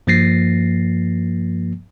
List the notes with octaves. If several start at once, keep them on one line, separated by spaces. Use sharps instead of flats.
G2 F3 A#3 A6 A#6 C7